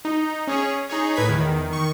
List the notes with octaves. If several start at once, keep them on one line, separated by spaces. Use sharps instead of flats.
D#4
C#4 G#4 C#5
D#4 G#4 C#5
A2 B4 G#6 B6
E2 D#3
D#3 C#6